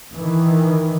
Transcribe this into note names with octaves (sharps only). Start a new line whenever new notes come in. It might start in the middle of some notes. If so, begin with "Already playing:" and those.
D#3 E3